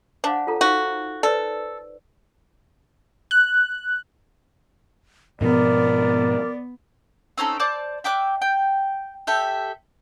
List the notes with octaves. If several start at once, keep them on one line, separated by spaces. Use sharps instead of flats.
D4 C5 F5 F#5
F4 A4 A#5
D#4 F#4 C5 F5
A4 B4 C5 D5
F#6
G#2 B2 F3 B3 A#4 D5
C4 C#4 D#4 A4
C5 D5 A5 D6
E5 G5 D6 F#6
G5
G4 A4 E5